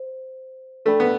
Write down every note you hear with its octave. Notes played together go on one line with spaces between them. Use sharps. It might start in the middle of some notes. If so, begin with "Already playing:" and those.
Already playing: C5
A3 D4 A4 D5 G5 B5
B3